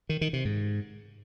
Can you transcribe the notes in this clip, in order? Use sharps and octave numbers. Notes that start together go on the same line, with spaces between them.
D#3
D#3
C3
G#2